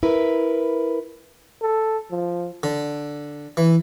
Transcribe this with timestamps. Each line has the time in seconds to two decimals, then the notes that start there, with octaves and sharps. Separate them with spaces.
0.03 E4 A#4 B4
1.62 A4
2.11 F3
2.63 D3
3.57 E3